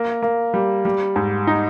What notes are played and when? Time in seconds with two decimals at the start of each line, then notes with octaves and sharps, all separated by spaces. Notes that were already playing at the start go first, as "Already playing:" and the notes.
Already playing: A#3
0.23 A#3
0.54 G3
0.85 G3
1.16 G#2
1.47 D#4